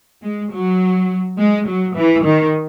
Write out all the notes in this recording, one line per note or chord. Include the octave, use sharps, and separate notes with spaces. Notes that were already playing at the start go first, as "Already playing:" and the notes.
G#3
F#3
G#3
F#3
E3
D#3